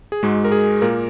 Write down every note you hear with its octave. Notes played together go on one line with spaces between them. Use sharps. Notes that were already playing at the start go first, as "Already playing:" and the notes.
G#4
G#2 G#3 F#4
A#4
G#4
A#2 A#3 A#4